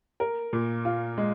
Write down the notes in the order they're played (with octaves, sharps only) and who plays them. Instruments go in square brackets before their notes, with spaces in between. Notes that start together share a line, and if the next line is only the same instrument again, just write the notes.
[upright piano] A#4
A#2
F4
G#3